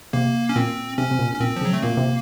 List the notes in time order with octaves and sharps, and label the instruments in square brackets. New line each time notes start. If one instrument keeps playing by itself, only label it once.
[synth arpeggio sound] C3 [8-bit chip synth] A#3
[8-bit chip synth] C#4
[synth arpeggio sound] A#2 [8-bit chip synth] C4
[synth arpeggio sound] C3 [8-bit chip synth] C#4
[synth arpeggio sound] C3
A#2
[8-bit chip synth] C#4
[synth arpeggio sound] A#2 [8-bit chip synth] C4
[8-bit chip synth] F3
[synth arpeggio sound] C#3 [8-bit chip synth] F#3
[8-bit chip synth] A3
[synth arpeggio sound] A#2 [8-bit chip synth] A#3
[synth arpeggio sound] C3